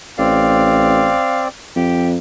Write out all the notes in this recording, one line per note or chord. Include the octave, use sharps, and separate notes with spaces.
A1 C4 D5 F5
F2 G4